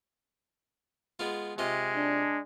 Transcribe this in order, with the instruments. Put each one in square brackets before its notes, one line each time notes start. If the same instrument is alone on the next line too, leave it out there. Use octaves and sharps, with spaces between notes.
[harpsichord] G#3 B3 F4
[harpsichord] C3 F4 D#5 [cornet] G#3
[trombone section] D4